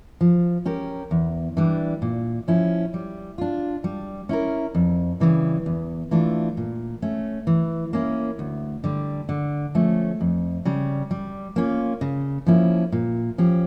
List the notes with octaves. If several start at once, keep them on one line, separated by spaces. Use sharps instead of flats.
F3
C#4 G4 A#4
E2
E3 G3 D4
A#2
F3 C#4 E4
G3
D4 F4
G3
C#4 E4 A#4
F2
C#3 E3 G3
E2
E3 A3 D4 F4
A#2
A3 C#4
E3
A#3 C#4 E4
D2
D3 G3
D3
F3 A3 C#4
F2
C#3 G3
G3
A#3 C#4 F4
C#3
F3 A#3 C#4 E4
A#2
F3 C#4 G4